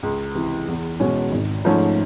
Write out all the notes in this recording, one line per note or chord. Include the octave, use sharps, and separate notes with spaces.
C#2
C3 E3
E2
B2 G#3 C#4
G#1
G#2 F3 A3 C#4